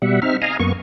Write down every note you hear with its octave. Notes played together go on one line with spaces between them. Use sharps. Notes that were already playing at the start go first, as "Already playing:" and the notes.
B2 G3 E5 F#5
C4 D#4 E5 F6
D#5 F5 G#5 A#5
F#2 A#3 B3 C#6